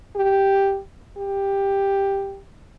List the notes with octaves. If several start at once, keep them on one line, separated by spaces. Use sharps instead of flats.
G4
G4